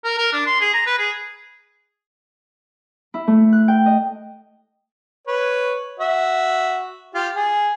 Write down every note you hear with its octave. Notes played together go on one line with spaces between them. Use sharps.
A#4
A#4
D4
C6
G#4
A#5
B4
G#4
E4
A3
F#6
G5
D#5
B4 C#5
F#4 E5
F4 G4
G#4